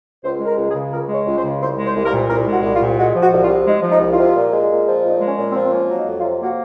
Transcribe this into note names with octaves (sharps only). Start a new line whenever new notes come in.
C#2 C5
G#3
A#4
C#2
G#4
C#3
C#2 A#4
G#3
C#5
C#2
C5
C#3
C2 C5
G#3
C5
C2
A#4
A#2
C2 A#4
G#3
F#4
C2
F4
A#2
G#3 F#4
F3
F#4
C2
F4
C3
G#3 D#4
F3
D#4
C2
F4
C3
A#2
G#3
A#2
F3
A#2 D#4
G#3
C#4
A#2
C4
F3
C4
A#3 C#4
F#3
D#4
F2
F4
C3
A#3 F#4